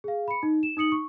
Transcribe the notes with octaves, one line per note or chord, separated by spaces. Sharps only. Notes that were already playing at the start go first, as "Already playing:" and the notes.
G#4 F5
B5 C#7
D#4
E7
D#4 D#6 C#7 F#7
C#6